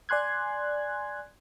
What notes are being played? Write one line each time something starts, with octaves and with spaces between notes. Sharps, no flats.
D5 G#5 C6 F#6 G#6